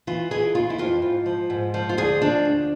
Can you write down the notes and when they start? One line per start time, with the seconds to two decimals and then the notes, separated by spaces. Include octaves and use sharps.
0.07 E3 F4
0.31 E3 G#4
0.55 E3 F4
0.70 E4
0.78 F2 F4
1.02 G#2
1.26 F3
1.50 G#2
1.74 F3
1.89 F4
1.97 D2 G#4
2.22 F3 D4
2.45 D2